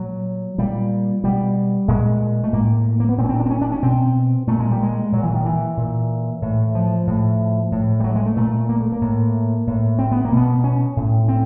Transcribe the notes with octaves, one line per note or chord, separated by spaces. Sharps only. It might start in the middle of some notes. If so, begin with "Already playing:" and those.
Already playing: A#2 F#3
A#2 G3
B2 G3
A#2 G#3
A3
A2 A#3
A#3
B3
A#2 C4
C#4
C4
D4
C4
C#4
D4
C#4
B2 C4
A#2 A3
G#3
G3
G#3
A#2 F#3
E3
D#3
E3
A#2
A2
F3
A2
A2
G3
F#3
G#3
A3
A#2 A3
A#3
A3
A#3
A2
A2
C4
B3
A#3
B2
B3
C#4
A2
C4